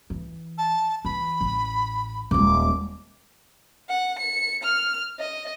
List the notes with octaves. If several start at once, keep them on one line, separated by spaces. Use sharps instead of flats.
E3
A5
E3 B5
A1
D#1 G#3 D6
F#5
C#7
F6
D#5